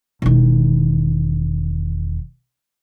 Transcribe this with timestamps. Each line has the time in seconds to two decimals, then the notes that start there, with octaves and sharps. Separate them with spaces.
0.22 E1 D#3